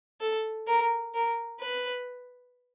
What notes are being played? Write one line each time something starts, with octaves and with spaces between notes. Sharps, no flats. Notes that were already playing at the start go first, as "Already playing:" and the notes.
A4
A#4
A#4
B4